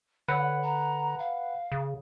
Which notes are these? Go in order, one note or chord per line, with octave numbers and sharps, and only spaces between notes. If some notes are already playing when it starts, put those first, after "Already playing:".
D3 B4 C#5 F#5
A#5
F5
C#3